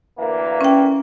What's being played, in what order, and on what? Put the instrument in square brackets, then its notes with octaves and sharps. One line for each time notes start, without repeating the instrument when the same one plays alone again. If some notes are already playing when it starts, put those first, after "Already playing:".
[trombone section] D2 E3 A#3
[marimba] C#4 G5